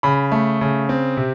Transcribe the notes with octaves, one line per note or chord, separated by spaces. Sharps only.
C#3 B5
A3
C#3
C4
C3